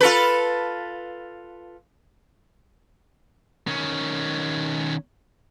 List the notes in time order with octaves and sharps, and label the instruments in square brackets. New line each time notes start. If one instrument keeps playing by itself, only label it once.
[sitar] F4 A4 B4
[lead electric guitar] D#3 C#4